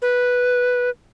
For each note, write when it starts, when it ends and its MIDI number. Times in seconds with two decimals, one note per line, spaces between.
0.02 0.90 71